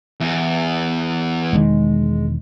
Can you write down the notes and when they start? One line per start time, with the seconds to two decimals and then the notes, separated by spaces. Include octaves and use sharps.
0.20 E2
1.53 E1 D#3 G#3